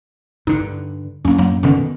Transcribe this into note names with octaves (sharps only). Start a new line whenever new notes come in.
G2 D3 D#4
F#2 A2 A#3 C#4
F#3 A#3
B2 D3 D#3 B3 C#4